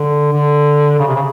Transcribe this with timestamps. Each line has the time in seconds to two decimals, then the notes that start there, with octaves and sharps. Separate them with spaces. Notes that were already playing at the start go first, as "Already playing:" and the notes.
Already playing: D3
0.33 D3
0.99 C#3
1.07 C3
1.16 C#3